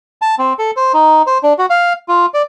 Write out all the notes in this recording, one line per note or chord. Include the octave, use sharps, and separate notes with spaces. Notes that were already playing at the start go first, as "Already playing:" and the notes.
A5
C4
A4
C5
D#4
C5
D4
F#4
F5
F4
D5